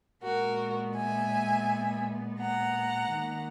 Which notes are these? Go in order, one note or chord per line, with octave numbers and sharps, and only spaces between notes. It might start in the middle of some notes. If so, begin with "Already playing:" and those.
A#2 G#3 B3 F#4 A#4
E5 G#5
F#5 A#5
D#3 A#3